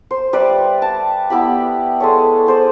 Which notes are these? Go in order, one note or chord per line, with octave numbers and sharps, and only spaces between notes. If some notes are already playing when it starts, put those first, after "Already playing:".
C5
G3 B4 D5 E5
A5
B3 E4 G4 B5
G#3 A4 C#5
G#4 C5 D5